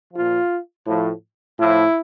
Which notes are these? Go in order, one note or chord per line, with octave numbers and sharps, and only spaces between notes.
A#2 F3 F4
A2 F3
A2 F3 E4